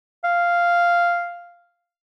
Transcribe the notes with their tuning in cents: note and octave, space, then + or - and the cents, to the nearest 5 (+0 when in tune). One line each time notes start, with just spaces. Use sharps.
F5 -5